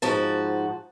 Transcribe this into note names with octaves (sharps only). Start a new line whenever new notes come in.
G#2 F3 F#4 A5